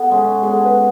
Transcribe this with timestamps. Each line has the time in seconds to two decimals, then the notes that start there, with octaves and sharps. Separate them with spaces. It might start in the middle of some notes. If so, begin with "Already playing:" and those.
Already playing: B3 A4
0.10 B2 G#3 C#4
0.43 B2 G#3 C#4 G#4
0.53 A4
0.65 B4